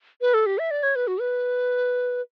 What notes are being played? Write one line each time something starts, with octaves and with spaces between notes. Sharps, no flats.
B4
A4
G4
E5
D5
C#5
B4
F#4
B4